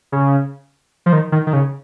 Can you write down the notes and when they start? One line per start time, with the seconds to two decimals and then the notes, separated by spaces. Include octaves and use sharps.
0.12 C#3
1.06 F3
1.13 D#3
1.32 D#3
1.47 D#3
1.53 C#3